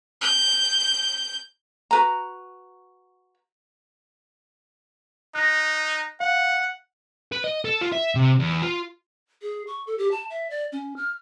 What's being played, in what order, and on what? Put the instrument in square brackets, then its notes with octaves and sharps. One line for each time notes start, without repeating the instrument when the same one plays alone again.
[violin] G6
[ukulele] F#4 B4 A#5
[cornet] D#4 [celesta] F#6 A#6
[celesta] F5 [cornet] F#5
[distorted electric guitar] B4
D#5
A4
F4
E5
C3
E2
F4
[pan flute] G#4
C#6
A4
G4
A5
E5
D5
C#4
F6